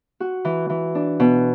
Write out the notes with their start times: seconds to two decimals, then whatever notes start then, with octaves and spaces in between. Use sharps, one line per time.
0.20 F#4
0.45 E3
0.70 E3
0.95 D4
1.20 B2